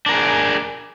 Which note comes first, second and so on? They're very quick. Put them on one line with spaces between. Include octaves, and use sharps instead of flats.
D4 A#4 G#4